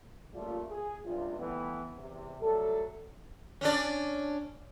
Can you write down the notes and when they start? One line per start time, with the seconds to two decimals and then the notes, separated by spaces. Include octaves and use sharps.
0.34 C#3 G3 A3 A#3 F4
0.70 G#4
1.04 C#2 G2 C3 G3 F4
1.38 A2 E3 G3 B3
1.96 E2 C3
2.41 F#3 G3 A3 A4
3.61 C#4 D4 D5